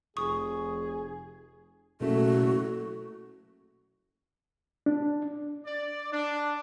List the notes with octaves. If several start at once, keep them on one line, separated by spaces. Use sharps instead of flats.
F1 G#4 C#6 D#6
F#1 B2 A3 F#4
D4
D5
D4